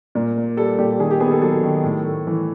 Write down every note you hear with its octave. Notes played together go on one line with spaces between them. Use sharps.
A#2 A#4
A#3
G3 A4
A#2 G4
D#3 G#4
G4
B3 G#4
A4
F#3 A4
D#3
A2
A3
E3